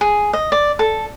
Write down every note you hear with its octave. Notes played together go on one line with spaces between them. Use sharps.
G#4
D#5
D5
A4